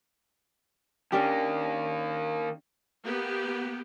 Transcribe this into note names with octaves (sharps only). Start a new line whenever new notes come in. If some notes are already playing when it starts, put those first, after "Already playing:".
D#3 A#3 C#4 D4 G4
A#3 B3 G4